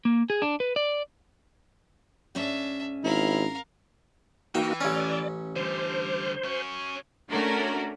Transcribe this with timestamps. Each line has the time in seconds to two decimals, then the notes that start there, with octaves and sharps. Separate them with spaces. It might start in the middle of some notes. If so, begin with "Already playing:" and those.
0.05 A#3
0.30 G#4
0.42 D4
0.60 B4
0.76 D5
2.35 G#2 C#4 D4 E5
3.04 G#1 E4 A#4 F5
4.55 E3 A#3 D#4 F#4 G5
4.81 A1 C#4 D5
5.56 D3 G3 C5
6.44 C#4 F#4
7.30 A3 C#4 D4 F#4 A#4